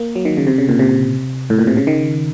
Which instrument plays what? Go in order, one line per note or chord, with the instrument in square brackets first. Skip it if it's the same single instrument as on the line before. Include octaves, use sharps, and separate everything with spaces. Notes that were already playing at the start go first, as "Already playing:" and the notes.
Already playing: [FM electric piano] A#3
F#3
D#3
C#3
C3
C#3
A#2
C3
A2
A#2
C3
C#3
D#3